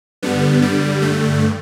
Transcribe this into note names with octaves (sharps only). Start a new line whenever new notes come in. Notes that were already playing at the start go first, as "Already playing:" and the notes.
G2 D3 G3 B3
G3
A3